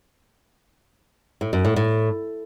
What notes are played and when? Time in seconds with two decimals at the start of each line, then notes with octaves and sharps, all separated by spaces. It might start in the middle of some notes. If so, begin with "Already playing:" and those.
1.41 A2
1.53 F#2
1.65 A2
1.76 A2